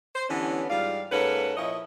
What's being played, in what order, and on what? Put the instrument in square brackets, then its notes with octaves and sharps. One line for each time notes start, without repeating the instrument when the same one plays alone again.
[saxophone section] C5
D3 E3 G3 B3 C#4
G#2 G3 F4 D5 F5
G#2 A#3 C#4 A4 B4 F#5
A#2 F3 E4 C#5 D#5